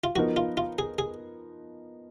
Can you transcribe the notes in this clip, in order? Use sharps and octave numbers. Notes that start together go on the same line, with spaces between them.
F4
F3 B3 D#4 F#4 A#4
F4
F4
G#4
G#4